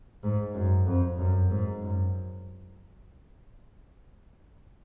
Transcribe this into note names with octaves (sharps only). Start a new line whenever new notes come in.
G#2
F#2
F2
F#2
G#2
F#2